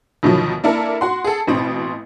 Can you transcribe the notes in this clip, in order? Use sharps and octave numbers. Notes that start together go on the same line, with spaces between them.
D2 B2 D#3 F3 F#3
A#3 D4 E4 A4 A#4
F#4 F#5 C6
G#4 A4
A1 B2 C4